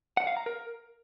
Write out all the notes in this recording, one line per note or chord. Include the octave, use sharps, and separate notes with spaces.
F#5
F5
A#5
A#4